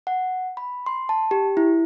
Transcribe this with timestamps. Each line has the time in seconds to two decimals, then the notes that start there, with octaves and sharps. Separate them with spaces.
0.07 F#5
0.57 B5
0.86 C6
1.09 A5
1.31 G4
1.57 E4